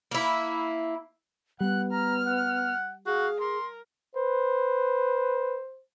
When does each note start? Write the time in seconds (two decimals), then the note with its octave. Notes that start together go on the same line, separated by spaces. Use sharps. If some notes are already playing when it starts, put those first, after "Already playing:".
0.11 A#3 E4
1.60 G3 B3 F#5 F#6
1.91 A#5 F6
2.26 F#5
3.06 F#4 G#4 F5
3.40 A#4 C6
4.16 B4 C5